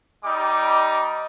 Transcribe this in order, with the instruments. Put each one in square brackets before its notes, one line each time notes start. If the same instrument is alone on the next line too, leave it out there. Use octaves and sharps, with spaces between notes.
[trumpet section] G3 D#4 D6